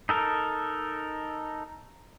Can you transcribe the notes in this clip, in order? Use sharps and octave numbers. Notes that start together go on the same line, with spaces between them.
D#4 A4 A#4